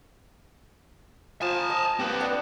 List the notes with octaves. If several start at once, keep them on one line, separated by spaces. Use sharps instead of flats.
F3 G#5 A5
D#5
C4 G4 B4
D4 F#5